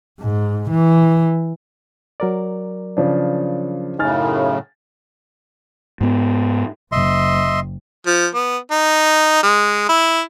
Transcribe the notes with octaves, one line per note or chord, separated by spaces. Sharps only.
G#2
E3
F#3 A#4 D5
C#3 F3 D4
F#2 A2 C#3 D#4 G#5 F6 A6
G#2 B3
F#1 D#5 E5 C6
F3
B3
D#4
G#3
E4